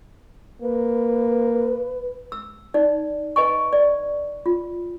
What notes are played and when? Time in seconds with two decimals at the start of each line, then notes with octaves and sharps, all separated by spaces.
0.62 A#3 B4
2.32 E6
2.74 D#4 D5
3.36 B4 D#5 G#5 C#6
3.73 D5
4.46 F4